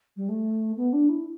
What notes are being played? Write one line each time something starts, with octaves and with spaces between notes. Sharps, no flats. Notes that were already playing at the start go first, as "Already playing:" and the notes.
G3
A3
B3
D4
E4